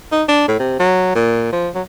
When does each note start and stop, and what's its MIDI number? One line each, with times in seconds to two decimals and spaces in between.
0.12 0.23 63
0.28 0.47 62
0.48 0.56 45
0.59 0.79 48
0.79 1.13 54
1.15 1.48 46
1.53 1.69 53
1.75 1.82 54